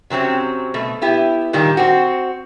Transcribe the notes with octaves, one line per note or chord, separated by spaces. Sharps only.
C3 F#3 C4 C#4
B2 A3
B3 E4 G4
A#2 D#3 G3
C4 F#4